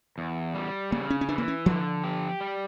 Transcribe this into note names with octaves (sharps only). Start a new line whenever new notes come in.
E2
G3
C#3 A#3
C#4
C#4
E3 D4
A#3
C#4
D3 F3
G4
G3